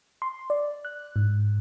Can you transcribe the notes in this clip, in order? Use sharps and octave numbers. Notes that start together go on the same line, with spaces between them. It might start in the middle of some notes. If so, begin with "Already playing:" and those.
C6
D5
F#6
G#2